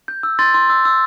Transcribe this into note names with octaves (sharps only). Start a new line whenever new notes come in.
G6
E6
C6 A6
C6
E6
E6